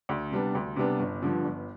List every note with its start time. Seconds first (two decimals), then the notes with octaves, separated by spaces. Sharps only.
0.09 D2
0.31 C3 G3 B3 D4
0.55 D2
0.76 C3 G3 B3 D4
1.00 G1
1.22 G2 D3 F3
1.44 G1